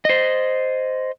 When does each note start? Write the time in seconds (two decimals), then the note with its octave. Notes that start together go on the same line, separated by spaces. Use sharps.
0.05 C5 D#5